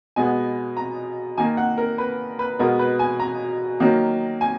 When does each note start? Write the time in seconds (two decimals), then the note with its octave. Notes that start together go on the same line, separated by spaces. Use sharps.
0.16 B2 G#3 B3 G#5
0.77 A#5
1.38 D#3 A#3 G#5
1.57 F#5
1.78 A#4
1.98 B4
2.39 B4
2.59 B2 G#3 B3 A#4
2.79 B4
2.99 G#5
3.20 A#5
3.80 D#3 F#3 A#3
4.41 G#5